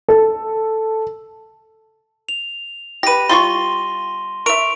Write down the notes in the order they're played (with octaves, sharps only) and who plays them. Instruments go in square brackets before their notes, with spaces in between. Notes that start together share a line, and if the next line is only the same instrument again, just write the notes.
[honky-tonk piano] A4
[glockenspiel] F7
[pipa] G4 B4 [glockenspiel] A#6 D#7
[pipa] G3 F4 C#6 [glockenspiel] C6 G7
[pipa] A#4 E5 [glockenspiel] C#6 D7 F7